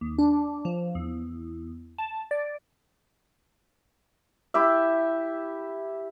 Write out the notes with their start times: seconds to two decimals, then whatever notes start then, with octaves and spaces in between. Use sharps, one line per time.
0.01 D#2
0.18 D4
0.65 F3
0.95 E2
1.98 A5
2.31 D5
4.54 E4 G4 E5